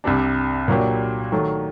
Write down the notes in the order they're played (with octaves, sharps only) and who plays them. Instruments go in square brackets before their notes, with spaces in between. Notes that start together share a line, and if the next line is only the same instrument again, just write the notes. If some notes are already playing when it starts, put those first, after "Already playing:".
[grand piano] C2 C3 G3 D4
A#2 F#3 A#3 D4 G4
D#3 F#3 A3